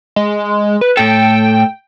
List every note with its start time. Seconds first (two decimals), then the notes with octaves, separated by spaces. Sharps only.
0.16 G#3
0.81 B4
0.97 A2 A4 G5